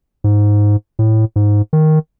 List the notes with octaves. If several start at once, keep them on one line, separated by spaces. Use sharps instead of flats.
G#2
A2
G#2
D#3